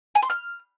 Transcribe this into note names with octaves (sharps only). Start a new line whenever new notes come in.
G#5
C6
F6